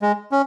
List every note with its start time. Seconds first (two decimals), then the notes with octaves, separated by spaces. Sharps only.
0.02 G#3
0.31 C#4